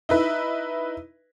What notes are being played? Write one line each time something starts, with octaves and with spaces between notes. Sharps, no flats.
D#4 E4 B4